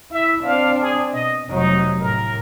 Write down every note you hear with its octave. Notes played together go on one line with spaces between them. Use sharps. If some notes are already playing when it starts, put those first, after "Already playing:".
E4 E5
C4 D4 F5
G#4
B2 D#5
F1 F#3 D#4
A2 A#4